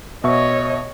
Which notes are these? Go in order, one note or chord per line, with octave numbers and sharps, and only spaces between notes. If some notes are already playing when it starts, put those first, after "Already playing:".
B2 C#5 D#5 E5 C#6